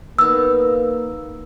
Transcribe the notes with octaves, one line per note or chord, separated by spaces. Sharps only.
A#3 B3 D#4 E6